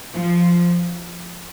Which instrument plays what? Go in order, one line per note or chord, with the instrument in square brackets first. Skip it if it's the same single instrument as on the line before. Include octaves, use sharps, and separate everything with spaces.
[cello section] F3